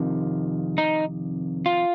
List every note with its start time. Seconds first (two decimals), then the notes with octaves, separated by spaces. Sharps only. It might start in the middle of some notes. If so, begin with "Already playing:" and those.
Already playing: F2 C3 D#3
0.78 D#4
1.66 F4